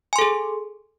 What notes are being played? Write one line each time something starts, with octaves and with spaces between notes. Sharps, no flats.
G#4 A4 G#5 C6